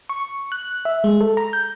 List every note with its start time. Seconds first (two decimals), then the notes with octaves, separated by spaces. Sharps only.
0.09 C#6
0.52 F#6
0.85 E5
1.04 G#3
1.21 A4
1.37 A#5
1.53 G6